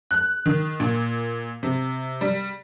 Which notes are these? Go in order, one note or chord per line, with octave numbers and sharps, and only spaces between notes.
F#6
D#3
A#2
C3
G3